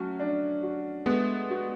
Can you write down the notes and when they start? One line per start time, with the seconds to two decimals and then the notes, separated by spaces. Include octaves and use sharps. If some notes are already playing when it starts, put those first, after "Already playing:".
Already playing: F#3 A3 C#4 F#4
0.19 D4
0.63 F#4
1.06 G#3 A3 B3
1.50 F#4